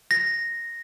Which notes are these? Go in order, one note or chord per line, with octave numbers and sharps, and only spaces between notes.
A#6